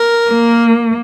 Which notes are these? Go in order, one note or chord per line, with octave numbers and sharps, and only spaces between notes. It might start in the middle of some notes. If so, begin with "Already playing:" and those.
Already playing: A#4
A#3